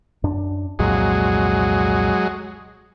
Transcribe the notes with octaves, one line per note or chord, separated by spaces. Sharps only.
F#2 D4
C2 F2 A#2 F#3 G#3